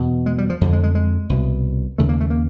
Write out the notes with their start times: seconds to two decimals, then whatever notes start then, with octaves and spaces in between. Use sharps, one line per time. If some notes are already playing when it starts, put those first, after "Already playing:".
Already playing: E2 B2
0.26 G#3
0.38 G3
0.50 F3
0.61 F2 D3
0.73 G#3
0.83 G#3
0.95 G#3
1.30 C2 B2
1.98 D#2 C#3 A3
2.09 A#3
2.21 A3
2.30 A#3